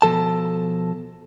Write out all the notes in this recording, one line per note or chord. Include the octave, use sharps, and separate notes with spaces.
B2 F3 A4 A5